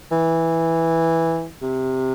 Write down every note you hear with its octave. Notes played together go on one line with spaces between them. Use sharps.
E3
C3